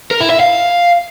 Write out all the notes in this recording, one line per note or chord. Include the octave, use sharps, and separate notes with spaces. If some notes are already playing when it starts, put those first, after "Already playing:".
A#4
E4
E5
F5